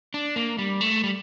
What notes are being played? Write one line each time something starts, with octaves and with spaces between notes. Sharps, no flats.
D4
A#3
G3
A3
G3